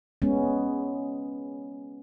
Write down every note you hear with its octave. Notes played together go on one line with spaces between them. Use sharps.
G#3 B3 C#4